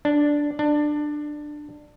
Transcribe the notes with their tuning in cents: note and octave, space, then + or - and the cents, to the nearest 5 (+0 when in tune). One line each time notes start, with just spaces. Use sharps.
D4 +0
D4 +20